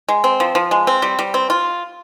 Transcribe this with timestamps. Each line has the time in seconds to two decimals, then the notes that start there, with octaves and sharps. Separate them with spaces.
0.09 G#3
0.24 C4
0.40 F3
0.55 F3
0.71 G#3
0.87 C4
1.02 G3
1.19 G3
1.34 C4
1.50 F4